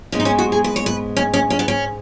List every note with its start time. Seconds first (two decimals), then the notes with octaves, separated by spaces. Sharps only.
0.12 G#2 G#3 B3 C#4
0.20 D#4
0.25 C#4
0.39 F#4
0.52 G#4
0.64 B4
0.76 C#5
0.86 B4
1.17 C#4
1.34 C#4
1.50 C#4
1.59 B3
1.68 C#4